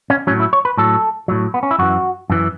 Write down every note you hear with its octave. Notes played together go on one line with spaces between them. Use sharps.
C#4
A2 F#3 C#4
E4
C#5
B4
A2 F#3 A4
A2 F#3
B3
C#4
E4
F#2 E3 F#4
F#2 E3